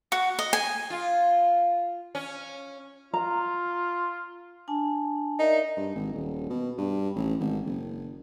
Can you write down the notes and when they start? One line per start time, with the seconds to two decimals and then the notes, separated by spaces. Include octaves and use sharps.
0.12 F#4
0.39 D#5
0.53 G#5
0.90 F4
2.15 C#4
3.14 F4 A#5
4.68 D4 G#5 A5
5.39 D#4 A#4 D5 E5
5.77 G2
5.95 G#1
6.12 D#1
6.50 B2
6.78 G2
7.15 A1
7.40 G#1
7.66 F#1